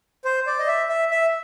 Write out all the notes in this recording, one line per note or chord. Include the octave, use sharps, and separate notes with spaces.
C5
D5
D#5
E5
E5
E5